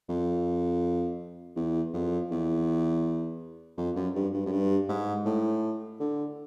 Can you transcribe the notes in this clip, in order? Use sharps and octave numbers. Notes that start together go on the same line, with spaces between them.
F2
E2
F2
E2
F2
F#2
G2
G2
F#2
G2
G#2
A2
D3